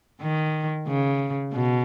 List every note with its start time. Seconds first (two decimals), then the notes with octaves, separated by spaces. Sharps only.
0.21 D#3
0.87 C#3
1.53 B2